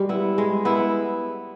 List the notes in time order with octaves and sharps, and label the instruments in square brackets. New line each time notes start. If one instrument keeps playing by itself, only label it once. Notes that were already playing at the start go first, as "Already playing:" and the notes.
Already playing: [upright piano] G3 [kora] G#3
[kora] B3 E4
G#3
B3 E4